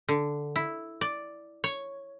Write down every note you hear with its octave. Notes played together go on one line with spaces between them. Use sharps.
D3
E4
D5
C#5